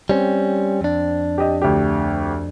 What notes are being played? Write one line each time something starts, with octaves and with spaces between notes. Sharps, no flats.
G3 C4 C#4
F2 D4
G4 D#5
D2 G4